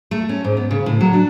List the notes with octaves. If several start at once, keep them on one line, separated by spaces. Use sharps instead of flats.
A3
C#4
G#2
B3
C#3
A2
F#3
D4